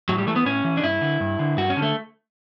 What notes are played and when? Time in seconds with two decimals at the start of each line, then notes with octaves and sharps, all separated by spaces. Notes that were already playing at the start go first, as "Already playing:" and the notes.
0.09 A2 F#3
0.18 G3
0.27 E3 A3
0.36 B3
0.46 A2 C#4
0.64 E3
0.77 D4
0.83 G2 E4
1.01 D3
1.20 G2
1.39 D3
1.57 G2 F#4
1.70 C#4
1.77 D3
1.82 A3